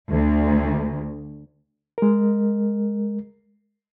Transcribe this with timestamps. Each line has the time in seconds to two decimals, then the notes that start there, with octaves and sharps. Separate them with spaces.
0.10 D2
1.98 G#3 A#4